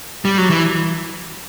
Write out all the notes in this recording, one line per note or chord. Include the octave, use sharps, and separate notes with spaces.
G3
F#3
E3